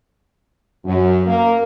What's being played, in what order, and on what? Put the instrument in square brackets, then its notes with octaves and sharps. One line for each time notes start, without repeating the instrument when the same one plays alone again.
[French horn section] F#2
A#3